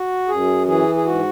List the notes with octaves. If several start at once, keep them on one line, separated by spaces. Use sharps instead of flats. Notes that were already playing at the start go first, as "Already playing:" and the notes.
Already playing: F#4
F#2 G#4
E3 G#4
G#4
G#2 F#4